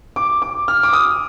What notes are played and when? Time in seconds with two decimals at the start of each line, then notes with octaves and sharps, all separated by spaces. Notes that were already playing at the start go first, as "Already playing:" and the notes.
0.16 D6
0.42 D6
0.68 F6
0.83 D6
0.93 D#6